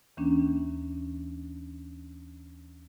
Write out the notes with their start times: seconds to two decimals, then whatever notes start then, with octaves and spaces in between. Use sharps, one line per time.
0.17 D#2 E3 A#3 C#4 D4